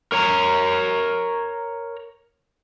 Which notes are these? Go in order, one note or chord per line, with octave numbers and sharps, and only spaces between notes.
A#4 C#5 A#5